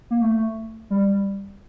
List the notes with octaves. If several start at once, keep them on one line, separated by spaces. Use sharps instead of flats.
A#3
A3
G3